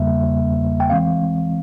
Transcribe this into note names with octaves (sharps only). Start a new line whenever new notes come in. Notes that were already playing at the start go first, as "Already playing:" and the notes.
Already playing: E2 C#3 G3 A#3 E5
G5
E3 G#3 C4 F5